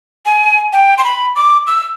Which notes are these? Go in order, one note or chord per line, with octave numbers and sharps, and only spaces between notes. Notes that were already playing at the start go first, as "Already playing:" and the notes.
G#5
G5
C6
B5
D6
E6